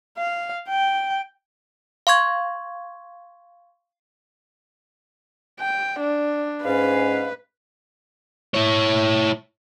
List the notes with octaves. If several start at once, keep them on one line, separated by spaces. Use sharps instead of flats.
F5
G5
F5 C6 C#6 G#6
G5
D4
G#2 C#4 B4 F5
E4 C#5